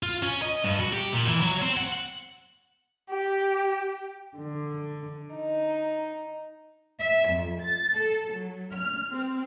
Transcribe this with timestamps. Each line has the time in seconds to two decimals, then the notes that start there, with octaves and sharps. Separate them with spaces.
0.03 F4
0.23 C#4
0.42 D#5
0.64 G2
0.80 F#4
0.93 G4
1.13 A#2
1.28 E3
1.41 F#3
1.62 C4
1.77 F#5
3.09 G4
4.38 D3
5.36 D#4
6.99 E5
7.29 F2
7.61 A6
7.98 A4
8.33 F#3
8.75 F6
9.11 C4